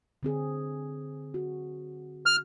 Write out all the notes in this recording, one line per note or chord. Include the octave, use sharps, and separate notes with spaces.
D3 C4 G#4
F#4
F6